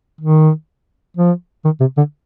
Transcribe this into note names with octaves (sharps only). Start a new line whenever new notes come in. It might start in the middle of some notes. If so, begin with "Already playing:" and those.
D#3
F3
D#3
C3
D3